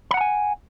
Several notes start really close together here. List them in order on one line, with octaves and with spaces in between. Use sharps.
B5 F#5 A#5 G#5